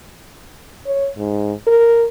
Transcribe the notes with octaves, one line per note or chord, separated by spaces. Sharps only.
C#5
G#2
A#4